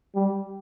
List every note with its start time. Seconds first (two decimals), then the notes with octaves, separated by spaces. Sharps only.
0.15 G3